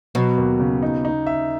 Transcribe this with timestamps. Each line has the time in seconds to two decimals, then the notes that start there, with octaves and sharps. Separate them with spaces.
0.15 B2 F#3
0.38 D#2
0.60 C#3
0.83 D#4
1.05 D#4
1.27 E5